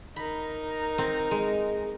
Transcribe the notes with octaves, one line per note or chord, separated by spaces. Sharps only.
D#4 A#4 B5
C4
G#3